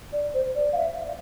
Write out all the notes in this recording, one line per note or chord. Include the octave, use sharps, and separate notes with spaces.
D5
C5
D5
F5
E5